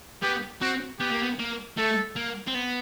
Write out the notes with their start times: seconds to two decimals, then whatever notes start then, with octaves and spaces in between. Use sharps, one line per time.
0.22 B3 G4
0.62 C4 F#4
1.00 B3 G4
1.11 A#3
1.23 B3
1.39 A#3
1.77 A3 A4
2.16 A#3
2.47 C4
2.54 B3